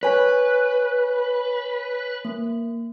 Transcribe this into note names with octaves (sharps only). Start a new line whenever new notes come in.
B4 C#5 G#5
A#3